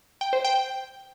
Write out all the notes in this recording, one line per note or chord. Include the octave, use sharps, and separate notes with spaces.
G5
C5
G5